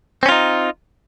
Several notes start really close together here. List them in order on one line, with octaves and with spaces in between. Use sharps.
C4 C#4 F4 D#4